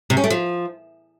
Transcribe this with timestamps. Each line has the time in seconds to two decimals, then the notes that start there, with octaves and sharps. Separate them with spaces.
0.10 C3
0.17 C#4
0.24 A3
0.30 F3